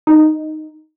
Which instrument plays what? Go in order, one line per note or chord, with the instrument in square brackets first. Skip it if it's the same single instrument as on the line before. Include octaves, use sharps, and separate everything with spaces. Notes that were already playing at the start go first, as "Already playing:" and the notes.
[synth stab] D#4